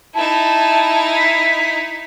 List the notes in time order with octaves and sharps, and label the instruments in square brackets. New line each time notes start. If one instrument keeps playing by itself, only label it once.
[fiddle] D#4 E4 [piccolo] A5
[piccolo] B6